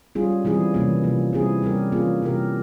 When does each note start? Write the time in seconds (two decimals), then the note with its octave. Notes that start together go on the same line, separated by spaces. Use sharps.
0.15 G3 C#4 F4 G#4
0.45 E3 G3 C4 E4 G#4
0.74 C3 E3 G3 A#3 C#4
1.03 C3 F3 A#3
1.33 G3 C4 E4 G#4
1.62 G3 C#4 G4 A#4
1.92 E3 A#3 C#4 F4 G#4
2.22 C3 G3 C#4 G4 A#4